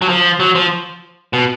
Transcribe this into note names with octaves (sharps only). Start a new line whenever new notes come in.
F#3
F3
F#3
F3
B2